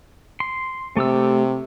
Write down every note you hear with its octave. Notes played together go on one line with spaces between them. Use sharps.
C6
C3 A3 G4 E6